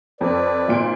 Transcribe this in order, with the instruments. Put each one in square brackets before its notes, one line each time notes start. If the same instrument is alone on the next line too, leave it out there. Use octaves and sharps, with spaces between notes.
[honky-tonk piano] F2 [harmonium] B4 D5
[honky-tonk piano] G#1 A#2 D7